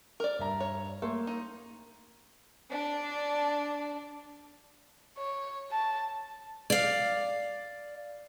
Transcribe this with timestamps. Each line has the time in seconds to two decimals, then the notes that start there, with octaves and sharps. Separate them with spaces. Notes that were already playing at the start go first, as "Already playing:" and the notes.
0.20 A#4 D5
0.39 G2 E5 A#5
0.60 C#5
1.02 A3 A#3 C6
1.27 D#4
2.71 D4
5.18 C#5
5.72 A5
6.70 D5 F5